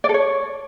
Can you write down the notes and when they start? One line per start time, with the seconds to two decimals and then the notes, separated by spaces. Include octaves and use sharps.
0.04 D5
0.09 A4
0.14 C#5